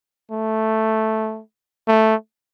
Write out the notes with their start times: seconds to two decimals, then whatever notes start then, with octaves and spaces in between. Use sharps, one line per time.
0.32 A3
1.88 A3